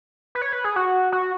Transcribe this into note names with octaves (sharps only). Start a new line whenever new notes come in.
B4
C#5
B4
G#4
F#4
F#4